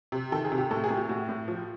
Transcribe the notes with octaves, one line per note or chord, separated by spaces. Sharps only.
C3
D#3 A4
G#4
C3
G4
A2 A4
G#4
A2
G4
A2 F#4
A2
F3